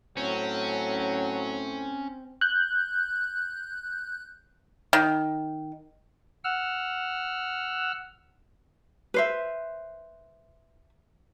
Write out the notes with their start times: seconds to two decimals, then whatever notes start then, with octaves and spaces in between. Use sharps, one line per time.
0.17 A2 F#3 C4 C#4
2.41 F#6 G6
4.93 D#3
6.44 F#5 E6 F6
9.14 B4 C5 E5